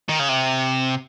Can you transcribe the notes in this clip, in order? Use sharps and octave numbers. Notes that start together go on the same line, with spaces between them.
D#3
C#3
C3